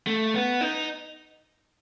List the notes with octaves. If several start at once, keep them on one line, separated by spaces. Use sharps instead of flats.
A3
B3
D#4